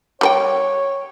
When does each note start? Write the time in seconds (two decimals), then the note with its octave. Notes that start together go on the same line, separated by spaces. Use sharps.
0.21 G3 B4 C#5 G5